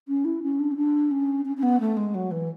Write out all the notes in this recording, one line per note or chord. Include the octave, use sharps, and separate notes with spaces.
C#4
E4
C#4
D4
C#4
D4
C#4
C#4
C#4
B3
A3
G#3
F#3
E3